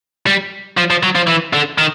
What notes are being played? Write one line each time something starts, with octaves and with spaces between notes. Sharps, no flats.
G3
F3
F3
F#3
F3
E3
D3
D#3